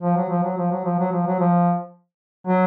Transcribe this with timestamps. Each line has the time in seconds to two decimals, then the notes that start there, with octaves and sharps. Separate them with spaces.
0.03 F3
0.16 F#3
0.30 F3
0.43 F#3
0.58 F3
0.72 F#3
0.85 F3
0.99 F#3
1.12 F3
1.27 F#3
1.40 F3
2.47 F#3